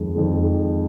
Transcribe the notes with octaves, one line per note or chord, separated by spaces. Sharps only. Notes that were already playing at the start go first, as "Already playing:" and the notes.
Already playing: F2 D#3 G#3
F2 D#3 G#3